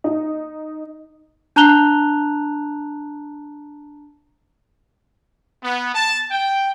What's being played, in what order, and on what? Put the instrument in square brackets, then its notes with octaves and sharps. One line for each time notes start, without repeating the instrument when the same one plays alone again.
[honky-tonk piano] D#4
[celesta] D4 A5 A#5 F#6 F7 G7
[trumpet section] B3
A5
G5